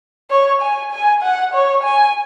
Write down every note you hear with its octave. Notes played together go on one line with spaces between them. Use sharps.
C#5
G#5
G#5
F#5
C#5
G#5